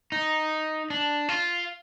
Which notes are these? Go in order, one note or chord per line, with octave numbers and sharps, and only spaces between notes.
D#4
D4
F4